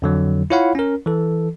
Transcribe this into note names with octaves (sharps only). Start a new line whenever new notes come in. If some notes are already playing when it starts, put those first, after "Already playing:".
F2 D3 F#3
E4 F4 C#5 F5 F#5 B5
C#4 A#4
E3 A4